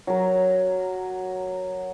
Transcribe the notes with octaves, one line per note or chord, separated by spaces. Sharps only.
F#3 A#4